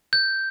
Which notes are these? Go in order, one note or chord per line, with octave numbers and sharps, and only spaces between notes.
G6